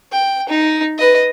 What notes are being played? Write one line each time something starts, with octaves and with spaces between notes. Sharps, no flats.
G5
D#4
B4 D#5